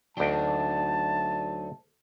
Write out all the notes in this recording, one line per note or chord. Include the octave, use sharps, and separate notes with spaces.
D2 F#3 D4 D#4 G5 A5